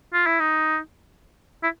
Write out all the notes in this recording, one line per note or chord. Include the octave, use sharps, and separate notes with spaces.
F4
E4
D#4
E4